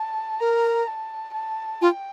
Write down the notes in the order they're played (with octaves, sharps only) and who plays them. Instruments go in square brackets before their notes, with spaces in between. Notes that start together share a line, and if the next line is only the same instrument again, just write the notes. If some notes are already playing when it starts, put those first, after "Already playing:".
Already playing: [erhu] A5
[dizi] A#4 [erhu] A#5
[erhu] A5
A5
[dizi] F4 [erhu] G5